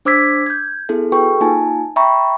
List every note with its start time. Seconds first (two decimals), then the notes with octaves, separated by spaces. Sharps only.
0.05 D4 C5 D6 E6 G#6 B6
0.46 G6 G#6
0.89 B3 E4 G#4 A4
1.12 F#4 G#4 A4 B4 G5 C#6
1.41 A#3 D#4 F4 G#5 A5
1.96 E5 G5 A#5 B5 C#6